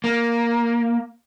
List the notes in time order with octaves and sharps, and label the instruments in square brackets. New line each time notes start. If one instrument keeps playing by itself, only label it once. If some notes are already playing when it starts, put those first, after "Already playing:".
[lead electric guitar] A#3